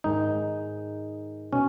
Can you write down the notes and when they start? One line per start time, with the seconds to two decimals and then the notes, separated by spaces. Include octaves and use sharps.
0.04 G#2 D#3 G#3 D#4
1.53 B2 C#4